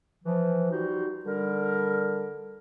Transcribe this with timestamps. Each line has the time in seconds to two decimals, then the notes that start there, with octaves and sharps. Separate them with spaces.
0.24 E3 F3
0.70 F#3 G3 D#4 F4 F#4
1.25 D3 G3 A#4